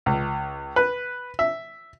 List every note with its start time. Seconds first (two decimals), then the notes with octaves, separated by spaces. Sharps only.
0.06 C#2
0.76 B4
1.39 E5